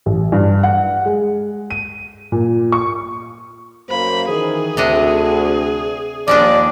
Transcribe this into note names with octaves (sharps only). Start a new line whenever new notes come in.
A1
G2
F#5
G#3
D#7
A#2
C#6
F#2 A#3 C5 B5
D#3 E3 G#4 A#4
D2 C3 D4 D#5
D#2 F3 G#3 D4 D5